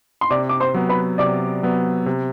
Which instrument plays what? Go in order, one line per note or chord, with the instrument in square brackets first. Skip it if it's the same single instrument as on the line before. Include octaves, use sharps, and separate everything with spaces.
[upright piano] C6
[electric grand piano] C3 [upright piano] D5 D6
[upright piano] D6
C5 C6
[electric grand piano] F#3 B3
[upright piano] B4 B5
[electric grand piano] C3 [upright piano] D5 D6
[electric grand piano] F#3 B3
C3